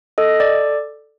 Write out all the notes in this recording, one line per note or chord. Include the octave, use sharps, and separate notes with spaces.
A4 D#5
D5